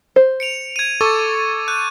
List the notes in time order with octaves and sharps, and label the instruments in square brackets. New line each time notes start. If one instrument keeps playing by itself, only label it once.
[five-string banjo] C5
[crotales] C#7 D7 F7
G#6 D#7
[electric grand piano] A4 [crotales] C#6 D6 A6
[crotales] F#6 G6 D#7